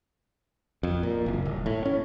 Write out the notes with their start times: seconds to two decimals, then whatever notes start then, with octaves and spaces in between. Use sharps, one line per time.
0.83 F2
1.03 A#2
1.26 F#1
1.45 D#1
1.66 A2
1.85 C#4